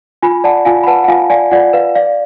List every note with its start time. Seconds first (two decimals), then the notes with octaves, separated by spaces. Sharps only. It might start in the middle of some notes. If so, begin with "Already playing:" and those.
0.22 F4 G#5 B5
0.44 D5 F#5 A5
0.65 F4 F5 G#5
0.83 B5
0.87 B4 F#5 A5
1.04 F#5
1.08 F4 F5 G#5
1.30 D5 F5 G#5
1.51 F4 D5 F#5
1.73 B4 F5
1.95 D5 F5